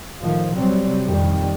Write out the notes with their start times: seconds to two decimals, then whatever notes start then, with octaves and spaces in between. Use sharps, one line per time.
0.21 A2 D#3 F3
0.56 C3 F#3 G3 C4
1.04 F2 A#2 D#3 G3